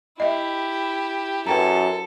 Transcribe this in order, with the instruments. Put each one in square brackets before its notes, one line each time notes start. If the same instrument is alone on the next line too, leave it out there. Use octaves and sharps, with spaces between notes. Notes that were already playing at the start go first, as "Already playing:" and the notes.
[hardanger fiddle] E4 G4 [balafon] D#5 E5
[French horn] F#2 [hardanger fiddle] A4 [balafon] B4 G5 A#5